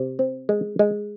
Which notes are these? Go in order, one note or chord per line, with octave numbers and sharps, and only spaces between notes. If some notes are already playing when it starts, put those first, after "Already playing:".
Already playing: C3
C4
G#3
G#3